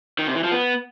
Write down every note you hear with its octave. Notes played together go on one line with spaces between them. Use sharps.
D#3
C3
E3
F3
B3